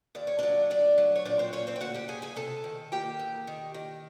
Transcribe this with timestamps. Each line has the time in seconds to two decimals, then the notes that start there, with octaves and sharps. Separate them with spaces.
0.15 D#2 D5
0.27 C#5
0.39 F#3 D4 D5
0.70 D2 D4 D5
0.98 F#3
1.15 C#5
1.25 A#2 D4 D5
1.39 C4 C5
1.53 A#3 C#4 C#5
1.67 C4 C5
1.76 G5
1.81 D2 F#4 F#5
1.94 G4 G5
2.08 C#3 G#4 G#5
2.22 G#4 G#5
2.36 C3 A4 A5
2.64 D#3
2.92 A#3 G4 G5
3.19 E2
3.47 D#3
3.74 D#3